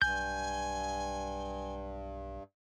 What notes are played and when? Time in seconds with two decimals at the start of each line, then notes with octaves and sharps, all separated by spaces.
0.02 B1 G2 G#5 G6